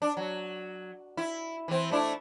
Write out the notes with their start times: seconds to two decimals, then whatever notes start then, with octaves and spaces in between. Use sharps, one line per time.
0.02 D4
0.17 F#3
1.17 E4
1.68 E3 C4
1.91 A3 D4 E4